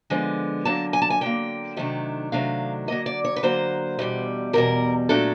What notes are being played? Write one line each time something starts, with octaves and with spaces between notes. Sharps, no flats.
D3 F3 G#3 B3
D3 F#3 A#3 A5
G#5
A5
G#5
D3 F#3 A#3 G5
C3 D#3 F#3 A3 D4
C3 D#3 F#3 A3 D4 F5
D3 F#3 A#3 D#5
D5
C#5
B4
D3 F#3 A#3 C5
E2 B2 G3
E2 B2 G3 A#4
A#2 F#3 A3 D4 A4